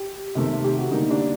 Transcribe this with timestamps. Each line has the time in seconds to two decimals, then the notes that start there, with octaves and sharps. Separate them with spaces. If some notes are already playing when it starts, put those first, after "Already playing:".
Already playing: G4
0.35 C3 D#3 A3 C4
0.64 G4
0.78 F#4
0.91 D3 G3 A#3 D#4
1.11 D4